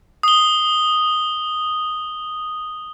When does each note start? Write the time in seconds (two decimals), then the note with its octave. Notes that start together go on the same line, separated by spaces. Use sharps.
0.23 D#6 G7